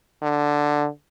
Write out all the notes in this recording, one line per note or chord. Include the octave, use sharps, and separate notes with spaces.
D3